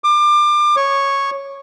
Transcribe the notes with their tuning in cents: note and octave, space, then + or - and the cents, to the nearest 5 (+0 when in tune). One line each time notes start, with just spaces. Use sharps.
D6 +30
C#5 -5